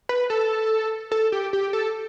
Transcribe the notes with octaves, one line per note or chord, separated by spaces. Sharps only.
B4
A4
A4
G4
G4
A4